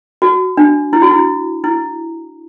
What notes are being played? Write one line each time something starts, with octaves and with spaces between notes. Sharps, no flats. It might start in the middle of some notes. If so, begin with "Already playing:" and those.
F#4
D4
E4
F#4
E4
E4